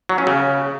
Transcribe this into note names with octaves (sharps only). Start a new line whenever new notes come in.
F#3
C#4
C#3